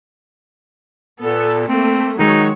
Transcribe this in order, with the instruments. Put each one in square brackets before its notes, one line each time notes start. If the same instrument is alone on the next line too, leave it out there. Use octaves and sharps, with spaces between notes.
[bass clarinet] A#2 [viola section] B3 A4
[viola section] A3 A#3 [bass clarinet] C4
[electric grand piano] D#3 G#3 [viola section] F#3 F#4 C#5 [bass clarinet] D#4